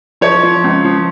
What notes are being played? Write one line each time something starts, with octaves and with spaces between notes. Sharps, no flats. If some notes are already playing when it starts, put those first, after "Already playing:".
F3 C#5
F3
C#2
F3